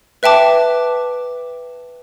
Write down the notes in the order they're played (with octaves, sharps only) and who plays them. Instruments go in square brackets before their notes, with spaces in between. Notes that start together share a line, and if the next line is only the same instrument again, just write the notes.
[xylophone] B4 E5 G5 A5 D6